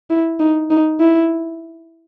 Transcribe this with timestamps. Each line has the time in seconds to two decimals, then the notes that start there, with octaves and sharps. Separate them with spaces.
0.10 E4
0.40 D#4
0.71 D#4
1.00 E4